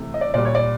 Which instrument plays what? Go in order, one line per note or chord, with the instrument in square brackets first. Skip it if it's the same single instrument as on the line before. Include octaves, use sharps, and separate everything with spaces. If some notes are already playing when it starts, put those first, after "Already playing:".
Already playing: [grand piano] C3 E3 A3
D#5
D5
A#2 G3 D5
C#5
D5